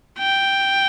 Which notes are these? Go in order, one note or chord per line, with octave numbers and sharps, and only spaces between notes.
G5